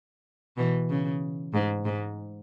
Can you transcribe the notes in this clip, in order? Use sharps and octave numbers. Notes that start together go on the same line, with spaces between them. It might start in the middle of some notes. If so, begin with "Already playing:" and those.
B2 E3
C#3
G#2
G#2